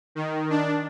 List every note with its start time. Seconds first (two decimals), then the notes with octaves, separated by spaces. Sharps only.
0.15 D#3
0.50 D4